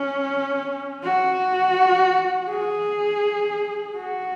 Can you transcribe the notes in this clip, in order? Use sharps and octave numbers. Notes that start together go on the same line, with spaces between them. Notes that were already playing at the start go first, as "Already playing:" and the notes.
Already playing: C#4
F#4
G#4
F#4